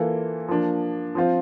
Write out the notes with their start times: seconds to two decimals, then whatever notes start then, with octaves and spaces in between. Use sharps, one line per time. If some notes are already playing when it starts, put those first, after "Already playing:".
Already playing: E3 A#3 F4 A4
0.48 F3 A#3 D4
1.15 F3 C4 F4 C5